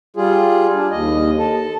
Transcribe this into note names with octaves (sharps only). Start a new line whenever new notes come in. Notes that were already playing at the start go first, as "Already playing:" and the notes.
G3 F4 G#4
D4
D#2 D#5
A4